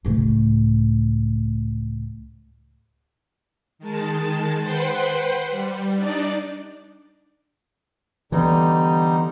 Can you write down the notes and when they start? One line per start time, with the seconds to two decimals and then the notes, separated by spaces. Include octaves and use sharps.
0.05 C#2 A2
3.79 D#3 G#3 A5
4.63 B4 C5 F#5 G5 C6
5.50 G3
5.95 D4 D#4 D5
8.32 D3 E3 G3 B3 D#4